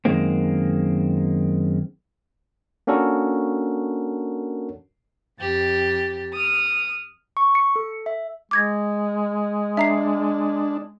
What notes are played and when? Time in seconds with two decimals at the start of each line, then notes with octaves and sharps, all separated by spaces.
0.05 F#2 D#3 G#3 A#3 C4
2.87 A#3 C#4 D4 F#4 A4 A#4
5.39 F2 G4 A6
6.32 D#6 F6
7.37 C#6
7.55 C#7
7.76 A4
8.06 E5
8.51 G#3 D6 G#6 A#6
9.77 D4 E5 A#5 C7